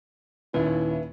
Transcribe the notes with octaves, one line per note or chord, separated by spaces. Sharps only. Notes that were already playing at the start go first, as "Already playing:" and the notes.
D#2 A#2 C#4 E4 B4 E5